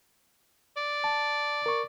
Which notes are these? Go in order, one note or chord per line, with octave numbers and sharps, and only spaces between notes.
D5
A5
A#4 C#6